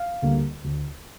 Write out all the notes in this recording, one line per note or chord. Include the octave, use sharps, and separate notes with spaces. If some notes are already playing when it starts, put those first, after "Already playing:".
Already playing: F5
D2 D3 G3 A#3
D2